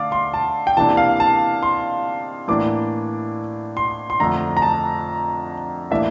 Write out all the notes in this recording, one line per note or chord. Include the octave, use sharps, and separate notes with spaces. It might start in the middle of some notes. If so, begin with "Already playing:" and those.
Already playing: D3 A3 D5 F5 D6
C6
A5
G5
C3 E3 A#3 D4 A5
F5
A5
C6
A2 E3 A#3 D4 D6
C6
C6
F2 D3 A3 D4 A#5
A#5
A5
A2 E3 A#3 D4 E5